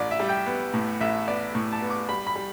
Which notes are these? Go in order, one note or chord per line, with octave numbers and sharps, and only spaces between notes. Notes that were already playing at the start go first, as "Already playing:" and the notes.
Already playing: A1 D5
E5
G3
G5
B3
A2
A1 E5
B3 D5
A2
A5
B3
D6
G3 B5
B5
G3